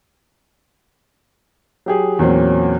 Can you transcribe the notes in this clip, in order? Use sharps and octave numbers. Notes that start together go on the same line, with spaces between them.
F#3 G4 G#4
E2 A#2 F#3 C4 C#4